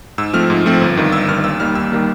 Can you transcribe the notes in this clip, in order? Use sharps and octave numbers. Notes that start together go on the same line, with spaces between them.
G#2 E6
F3 A3 C4 F6
G#2
F3 A3 C4
G1
G2 D#3
G1 E6
G2 D#3 F6
D#2 E6
D#3 G3 A#3 F6
D#2 E6
D#3 G3 A#3